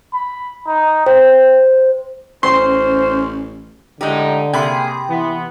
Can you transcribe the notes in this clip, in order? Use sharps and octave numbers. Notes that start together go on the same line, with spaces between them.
B5
D#4
C5 G5
A1 C#4 C5 C6
A2 D3 G#3 D#4 G4
C3 A#3 G#4 G5 B5 C6
E3 B3